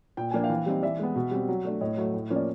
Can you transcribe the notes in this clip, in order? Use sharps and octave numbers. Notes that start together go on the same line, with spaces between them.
A#2 G5
F3 A#3 D4 G#5
F5 G5
E3
G3 C4 D#4
E3 D5 E5
G#3 B3
B2
G3 C4
F#3
A3 D4
A2 C#5 D#5
F#3 A3
A2
F3 A#3 C#4
D5